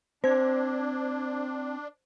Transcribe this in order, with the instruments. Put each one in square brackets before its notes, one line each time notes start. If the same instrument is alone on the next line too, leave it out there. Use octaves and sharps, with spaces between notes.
[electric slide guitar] C4 [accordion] D4 [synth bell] C5 G#6